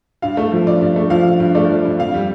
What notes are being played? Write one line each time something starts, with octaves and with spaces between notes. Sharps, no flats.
G2 F5
A3
F3
G2 D5
G2
A3
F3 F5
G2
G2
A3 D5
F3
G2
F2 F5
G3